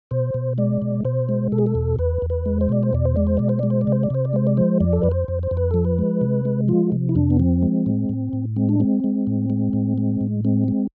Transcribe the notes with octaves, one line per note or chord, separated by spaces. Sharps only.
B2 C5
B2
G#3 D5
B2
B2 C5
G#3
B2 A4
G#4
A4
E2
E2 B4
E2
B4
G#3
C5
B2 D5
C5
E2 D5
C5
G#3 D5
C5
B2 D5
C5
G#3 D5
C5
D5
C3 C5
D5
C3 C5
D5
G#3 C5
D5
F3 C5
F2 D5
A4
F2 B4
C5
F2
C5
F2
B4
F3 A4
B4
G#3
C3
G#3
F3 F4
C3
E4
F2 D4
B3
F3 C4
G#3
A2
A2
A2
G#3 C4
D4
G#3 C4
G#3
A2
G#3
A2
G#3
A2
G#3 C4
G#3